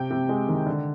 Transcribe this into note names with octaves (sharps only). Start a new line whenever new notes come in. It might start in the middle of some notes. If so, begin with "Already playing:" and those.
Already playing: C3 G5
C3
G#3
D#3
D3